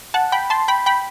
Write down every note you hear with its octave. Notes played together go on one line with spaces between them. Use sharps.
F#5 A5
G5 B5
A5 C6
G5 B5
G5 B5